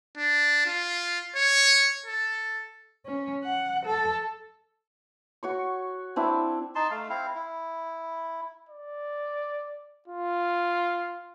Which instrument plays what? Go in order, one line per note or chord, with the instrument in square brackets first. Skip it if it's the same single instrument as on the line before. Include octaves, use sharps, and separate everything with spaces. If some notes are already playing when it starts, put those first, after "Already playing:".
[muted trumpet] D4
F4
C#5
A4
[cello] C#4
F#5
A4
[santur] F#4 C#5 C#6
C4 D4 E4
[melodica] D#4 A5 C6
A3 F5
C4 E4 F5
E4
[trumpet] D5
F4